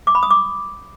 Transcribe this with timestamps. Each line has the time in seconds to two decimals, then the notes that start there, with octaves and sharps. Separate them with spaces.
0.07 D6
0.15 B5
0.23 D#6
0.30 D6